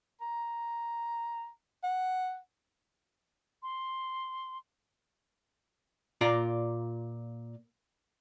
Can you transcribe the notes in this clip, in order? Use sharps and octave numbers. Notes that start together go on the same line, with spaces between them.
A#5
F#5
C6
A#2 F4 D5 A#5